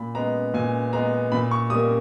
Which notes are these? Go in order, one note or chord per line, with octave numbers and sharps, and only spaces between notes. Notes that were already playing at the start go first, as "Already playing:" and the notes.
Already playing: A#2 B5
G#3 B3 A#5
A#2 G#5
G#3 B3 A#5
A#2 B5
C#6
G3 A#3 D#6